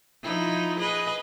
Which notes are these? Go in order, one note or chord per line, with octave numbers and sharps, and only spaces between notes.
F3 D#4 E4
G#4 B4 D#5